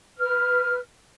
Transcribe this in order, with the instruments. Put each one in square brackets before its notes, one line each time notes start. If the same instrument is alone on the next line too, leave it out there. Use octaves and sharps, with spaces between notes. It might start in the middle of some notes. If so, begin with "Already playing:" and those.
[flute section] B4 F6